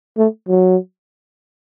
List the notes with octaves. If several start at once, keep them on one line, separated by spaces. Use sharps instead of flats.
A3
F#3